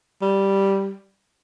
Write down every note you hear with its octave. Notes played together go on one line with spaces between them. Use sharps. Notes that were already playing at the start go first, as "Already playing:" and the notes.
G3